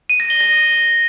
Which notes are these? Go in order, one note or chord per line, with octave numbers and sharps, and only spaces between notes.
D#7
A#6
G7
A#6